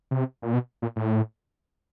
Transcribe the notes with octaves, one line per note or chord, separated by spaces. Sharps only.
C3
A#2
B2
A#2
A2